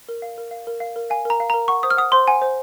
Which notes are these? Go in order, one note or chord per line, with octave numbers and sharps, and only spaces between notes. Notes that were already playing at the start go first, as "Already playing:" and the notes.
A#4
F5
A#4
F5
A#4
F5
A#4
F5 G#5
A#4 A#5
F5
A#4 A#5
F#5 C#6
C5 D#6
F6
F#5 D#6
C5 C6
F#5 G#5
C5